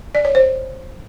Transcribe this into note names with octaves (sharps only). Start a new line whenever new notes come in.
D5
C#5
C5